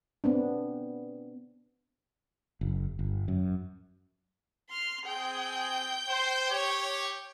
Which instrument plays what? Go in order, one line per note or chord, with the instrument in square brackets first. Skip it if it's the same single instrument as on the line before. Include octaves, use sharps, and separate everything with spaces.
[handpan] B3 C4 D4
[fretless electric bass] F#1
G1
F#2
[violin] C6 F6
[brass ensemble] C4 G#4 [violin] G5 G6
[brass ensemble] C5
G4 C#5